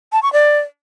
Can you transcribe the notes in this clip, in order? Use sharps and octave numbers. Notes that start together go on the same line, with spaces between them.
A5
C#6
D5